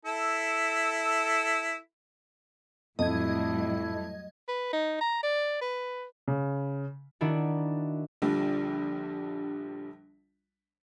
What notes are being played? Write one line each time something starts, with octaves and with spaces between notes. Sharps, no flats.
E4 A4
F2 A2 F#3 G3 E4 D#5 G#6
B4
D#4
A#5
D5
B4
C#3
D#3 D4 E4 F#4
A#1 D3 F3 G3